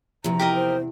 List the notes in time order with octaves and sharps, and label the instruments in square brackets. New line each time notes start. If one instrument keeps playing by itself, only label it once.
[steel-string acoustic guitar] E2 C3 [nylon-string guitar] F3 [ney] A#5
[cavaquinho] G4 A#4 D#5
[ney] C5